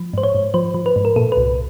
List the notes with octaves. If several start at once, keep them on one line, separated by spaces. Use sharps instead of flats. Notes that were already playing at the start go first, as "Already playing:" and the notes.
Already playing: F3
G#2 C5
C#5
G#2
F3 C5
F3
B4
G#2
A#4
A#2 A4
B4
C2